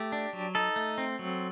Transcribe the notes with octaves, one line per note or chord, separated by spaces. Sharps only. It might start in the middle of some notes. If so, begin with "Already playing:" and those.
Already playing: A3 G4
D4
F#3
D#4 A4
A3
C4
F#3